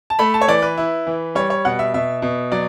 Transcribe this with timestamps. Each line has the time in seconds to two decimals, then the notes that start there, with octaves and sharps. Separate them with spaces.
0.10 A5
0.19 A3 B5
0.34 A5
0.41 C#5
0.48 E3 D5
0.62 B4
0.77 E4
1.07 E3
1.35 G3 C#5
1.50 C#5
1.65 B2 F#5
1.79 E5
1.94 B2 E5
2.22 B2
2.52 F#3 D5